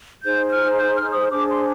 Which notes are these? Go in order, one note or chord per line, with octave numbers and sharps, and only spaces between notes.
D#4 G#4 C5 G6
F6
G6
F6
D#6
D4 G#4 C5 D6
C6